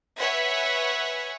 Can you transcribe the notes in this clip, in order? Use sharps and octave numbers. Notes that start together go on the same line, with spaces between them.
B4 C#5 E5 F#5 G#5